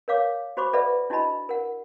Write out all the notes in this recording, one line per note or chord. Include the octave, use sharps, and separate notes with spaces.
A#4 C#5 F5 D6
F#4 C5 B5 C#6 D6
A4 B4 D5 E5 F#5 B5
D4 E4 F#4 D#5 A5 B5
A#4 F#5